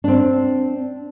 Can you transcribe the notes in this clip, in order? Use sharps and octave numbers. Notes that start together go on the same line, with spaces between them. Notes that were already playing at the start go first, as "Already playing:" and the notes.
C4 D4